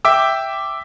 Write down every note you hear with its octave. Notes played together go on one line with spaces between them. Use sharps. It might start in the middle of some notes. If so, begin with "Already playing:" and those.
E5 G5 D6 E6